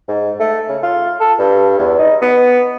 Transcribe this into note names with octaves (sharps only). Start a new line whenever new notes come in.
G#2
A3
C#3
F4
A4
G2
E2
D#4
B3